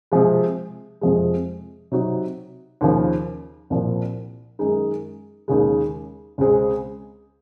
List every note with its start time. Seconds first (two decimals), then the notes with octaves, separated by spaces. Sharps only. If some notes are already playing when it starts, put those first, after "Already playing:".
0.12 C3 F3 G#3
1.01 F2 C3 F3 G#3
1.91 C3 F#3 C4 D#4 F#4
2.81 D#2 C#3 F3
3.70 C2 A#2 F3
4.59 F#2 D#3 G#3 D#4
5.48 D#2 C#3 G#3
6.38 C#2 C#3 G#3 C4